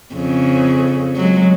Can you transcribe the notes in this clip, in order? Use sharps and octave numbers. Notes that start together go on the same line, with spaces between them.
F2 C#3
F#3 G#3